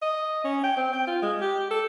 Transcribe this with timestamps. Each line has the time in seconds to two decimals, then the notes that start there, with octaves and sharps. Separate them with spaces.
0.02 D#5
0.44 C#4
0.63 G5
0.76 C4
0.93 G5
1.07 F4
1.22 G#3
1.41 G4
1.70 A4